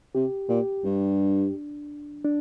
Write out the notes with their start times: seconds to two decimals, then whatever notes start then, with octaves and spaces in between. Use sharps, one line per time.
0.15 C3 G4
0.49 A#2 G4
0.84 G2 D4
2.25 D4